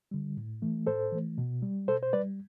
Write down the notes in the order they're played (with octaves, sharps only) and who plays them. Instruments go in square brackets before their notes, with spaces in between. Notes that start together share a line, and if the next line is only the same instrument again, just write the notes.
[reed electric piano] D3 G3
A2
E3 A3
A2 A4 C5
E3 A3
B2
G3
B2 A4 C5
C5
G3 B4 D5